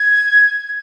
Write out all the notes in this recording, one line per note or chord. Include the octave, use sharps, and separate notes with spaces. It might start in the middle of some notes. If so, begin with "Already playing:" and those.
Already playing: G#6